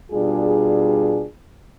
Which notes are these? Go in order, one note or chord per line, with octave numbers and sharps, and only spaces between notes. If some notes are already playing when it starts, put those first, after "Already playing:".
B2 G3 D4 F4 G#4